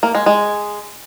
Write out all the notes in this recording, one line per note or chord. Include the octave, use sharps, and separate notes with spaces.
A#3
G#3
G#3